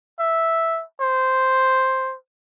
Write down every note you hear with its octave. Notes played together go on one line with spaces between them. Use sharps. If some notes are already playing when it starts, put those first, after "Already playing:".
E5
C5